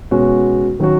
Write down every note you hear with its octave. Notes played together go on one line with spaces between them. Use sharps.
B2 G#3 C#4 F#4
D#3 F#3 C#4 F#4